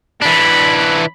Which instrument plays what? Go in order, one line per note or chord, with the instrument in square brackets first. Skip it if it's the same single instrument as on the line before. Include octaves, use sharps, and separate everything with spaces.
[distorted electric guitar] E3 D4 [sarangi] B5